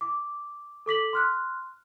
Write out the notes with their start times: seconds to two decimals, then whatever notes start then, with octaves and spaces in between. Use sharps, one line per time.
0.01 D6
0.86 A4 D6 B6 F#7
1.13 C6 F6 F#6